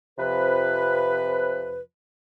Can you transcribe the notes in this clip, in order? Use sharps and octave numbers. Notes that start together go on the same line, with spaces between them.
F2 C3 F3 B4